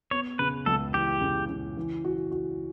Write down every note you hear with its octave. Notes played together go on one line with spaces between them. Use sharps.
B3 C#5
C#3 B4
C#2 A4
E3 G4
C#3
C#3
E3
F#4
F#4